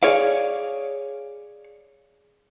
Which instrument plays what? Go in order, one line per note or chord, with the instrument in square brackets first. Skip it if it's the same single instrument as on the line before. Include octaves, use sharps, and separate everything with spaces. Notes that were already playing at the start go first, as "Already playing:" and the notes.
[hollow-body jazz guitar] G#4 C#5 D5 F5